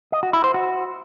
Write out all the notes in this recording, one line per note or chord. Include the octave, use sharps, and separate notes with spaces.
D#5
F#4
E4
C5
F#4